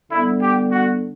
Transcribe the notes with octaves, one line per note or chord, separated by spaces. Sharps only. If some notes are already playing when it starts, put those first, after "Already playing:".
D3 G3 B3 D4 E4
G4
F#4